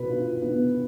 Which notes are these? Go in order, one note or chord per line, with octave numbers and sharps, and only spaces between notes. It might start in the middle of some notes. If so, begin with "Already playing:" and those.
Already playing: B2 B4
F4
B3